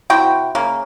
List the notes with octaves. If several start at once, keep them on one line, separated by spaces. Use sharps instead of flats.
C3 E4 F#4 G5
C#3 A#3